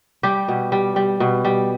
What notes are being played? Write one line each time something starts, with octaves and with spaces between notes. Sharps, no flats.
G3 G4
B2
G3
G3
B2
G3